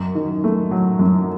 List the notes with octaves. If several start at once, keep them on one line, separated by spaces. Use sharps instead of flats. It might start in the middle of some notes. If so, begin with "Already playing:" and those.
Already playing: F#2
D#3
A3
F#3
F#2